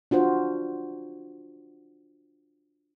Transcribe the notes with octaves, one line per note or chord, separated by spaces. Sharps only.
D4 F4 F#4 C5